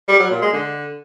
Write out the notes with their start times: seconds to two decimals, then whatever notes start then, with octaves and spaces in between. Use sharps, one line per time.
0.08 G3
0.20 F#3
0.31 A#2
0.42 G#3
0.53 D3